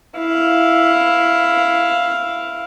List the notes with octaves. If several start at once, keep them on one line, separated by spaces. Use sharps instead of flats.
E4 F5